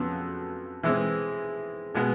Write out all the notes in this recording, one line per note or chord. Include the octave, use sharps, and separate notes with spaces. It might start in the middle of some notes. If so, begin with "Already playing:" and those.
Already playing: F2 C#3 F#3 B3
E3 G#3 C4
B2 G#3 B3